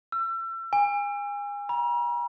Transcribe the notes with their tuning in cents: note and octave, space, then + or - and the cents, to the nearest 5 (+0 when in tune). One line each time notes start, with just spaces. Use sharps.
E6 +35
G#5 -30
A#5 +45